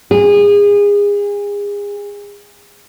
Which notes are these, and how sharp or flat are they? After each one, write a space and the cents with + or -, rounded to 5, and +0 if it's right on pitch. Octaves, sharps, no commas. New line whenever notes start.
G#4 -30